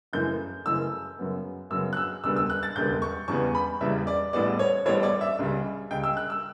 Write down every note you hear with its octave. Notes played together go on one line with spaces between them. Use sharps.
F#1 F#2 C#3 E3 A3 G6
F#1 F#2 C#3 E3 A3 E6
F#2 C#3 F#3 B3
F#2 C#3 F#3 B3 E6
F#6
E6
E1 D2 C#3 G3 B3 E6
E6
F#6
A6
E1 D2 C#3 G3 B3 G6
C#6
E2 C#3 G3 B3 C#6
B5
E2 C#3 G3 B3 E5
D5
A1 A2 G3 B3 D5
C#5
A1 A2 G3 B3 C#5
D5
E5
C#2 C#3 G3
C#2 C#3 G3 G5
E6
F#6
E6